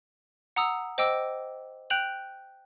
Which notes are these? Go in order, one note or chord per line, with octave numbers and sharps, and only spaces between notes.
F#5 A#5 D#6 E6
C5 D#5 G5 D6 E6
G5 F#6 G6 F7 F#7